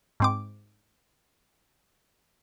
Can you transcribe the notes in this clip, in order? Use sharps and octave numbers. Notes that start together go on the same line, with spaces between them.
G#2 C4 D6